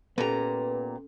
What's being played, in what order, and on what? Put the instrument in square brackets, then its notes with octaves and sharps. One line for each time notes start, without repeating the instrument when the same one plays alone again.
[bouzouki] A#2 A#5 [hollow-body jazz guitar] B3 G4 [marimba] C#4 A4 [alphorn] B4